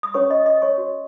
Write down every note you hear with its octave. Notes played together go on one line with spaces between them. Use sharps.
D#6
C#4 B4 C#5 C#6
D#5 D#6
D#5 D#6
C#5 C#6
F#4 C#5